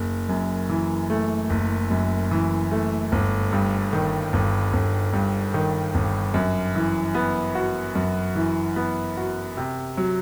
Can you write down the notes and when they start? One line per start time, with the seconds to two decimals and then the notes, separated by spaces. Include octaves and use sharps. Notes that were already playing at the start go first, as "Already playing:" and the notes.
Already playing: F#1
0.29 F#2
0.69 E3
1.10 A3
1.50 F#1
1.91 F#2
2.31 E3
2.71 A3
3.12 G1
3.52 G2
3.93 D#3
4.33 G1
4.73 G1
5.13 G2
5.54 D#3
5.94 G1
6.34 F#2
6.75 E3
7.14 B3
7.55 F#4
7.95 F#2
8.35 E3
8.76 B3
9.17 F#4
9.57 C3
9.97 F#3